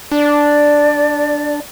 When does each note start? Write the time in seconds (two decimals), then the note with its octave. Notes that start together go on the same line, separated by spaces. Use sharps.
0.12 D4 D5